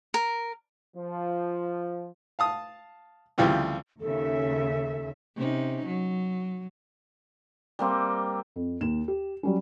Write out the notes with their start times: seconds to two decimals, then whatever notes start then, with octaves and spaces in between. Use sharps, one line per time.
0.14 A#4
0.96 F3
2.39 F5 A5 D#6
3.38 D2 C#3 E3 F3 G3 C4
4.01 D#2 C#3 A4 E5
5.36 C3 C#4 D#4
5.85 F#3
7.79 G3 A#3 C4
8.56 F2
8.81 D#2 E7
9.08 G4
9.43 F#3 G3 C#4